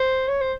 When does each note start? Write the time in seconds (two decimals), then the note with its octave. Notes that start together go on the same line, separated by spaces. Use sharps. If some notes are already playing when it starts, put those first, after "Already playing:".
Already playing: C5
0.28 C#5
0.41 C5